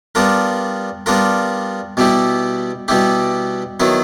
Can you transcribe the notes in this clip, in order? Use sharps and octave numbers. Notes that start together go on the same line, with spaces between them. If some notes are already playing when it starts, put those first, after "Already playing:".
G3 B3 D4 F4 A#4
G3 B3 D4 F4 A#4
B2 G3 B3 E4 G4
B2 G3 B3 E4 G4
D#3 F#3 B3 E4